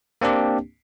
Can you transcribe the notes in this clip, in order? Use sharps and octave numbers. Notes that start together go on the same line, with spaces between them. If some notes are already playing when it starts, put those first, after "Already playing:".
A#3 C4 D4 G4